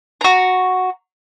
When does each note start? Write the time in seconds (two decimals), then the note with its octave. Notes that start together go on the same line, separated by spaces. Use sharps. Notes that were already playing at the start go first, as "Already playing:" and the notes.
0.21 F#4 A#5